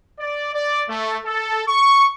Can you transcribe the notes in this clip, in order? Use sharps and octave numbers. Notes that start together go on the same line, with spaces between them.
D5
D5
A3
A4
C#6